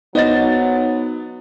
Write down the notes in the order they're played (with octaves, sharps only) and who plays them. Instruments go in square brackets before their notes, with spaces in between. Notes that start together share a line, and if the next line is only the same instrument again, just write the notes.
[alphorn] F#3 [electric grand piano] B3 A6 [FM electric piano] D#4 [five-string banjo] C5 D#5